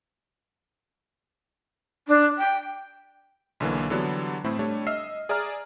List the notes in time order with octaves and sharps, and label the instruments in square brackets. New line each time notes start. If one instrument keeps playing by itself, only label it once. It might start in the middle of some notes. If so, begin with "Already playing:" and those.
[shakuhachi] D4
G5
[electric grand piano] B1 D3 E3 A#3
D3 E3 F#3 G3 B3 D4
A2 A3 C4 E4
G3 A3 D4 C#5
D#5 E5 E6 F6 C7
G#4 D5 E5 A#5 F6